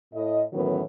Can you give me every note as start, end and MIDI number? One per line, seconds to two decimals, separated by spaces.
0.13 0.42 45
0.13 0.42 75
0.53 0.81 42
0.53 0.81 45
0.53 0.81 51
0.53 0.81 52
0.53 0.81 54
0.53 0.81 59